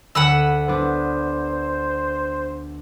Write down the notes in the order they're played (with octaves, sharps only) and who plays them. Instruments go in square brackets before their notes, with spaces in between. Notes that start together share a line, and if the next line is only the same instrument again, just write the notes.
[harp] D2 D#7 [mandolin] F#5 B5 E6
[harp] B3 D4 B4 [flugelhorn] C5